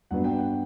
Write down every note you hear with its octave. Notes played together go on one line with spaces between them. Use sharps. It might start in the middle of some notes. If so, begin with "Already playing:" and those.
G2 F#3 B3 D4 F#5
G5
F#5